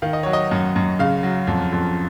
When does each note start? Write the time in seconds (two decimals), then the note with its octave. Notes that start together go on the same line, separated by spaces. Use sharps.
0.02 D#3 F5
0.13 D#5
0.23 F#3 C#5
0.33 D#5
0.51 F#2
0.76 F#2
0.99 C#3 F5
1.23 F#3
1.47 F2
1.73 F2